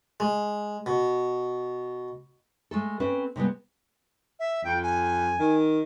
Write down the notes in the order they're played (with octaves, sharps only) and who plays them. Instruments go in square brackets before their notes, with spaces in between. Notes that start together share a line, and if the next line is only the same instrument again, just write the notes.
[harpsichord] G#3
B2
[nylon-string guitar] G#3 A3 A4
C4 C#4 B4
C3 G3 G#3 B3
[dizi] E5
[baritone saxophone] F2 [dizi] G5
[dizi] G#5
[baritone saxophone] D#3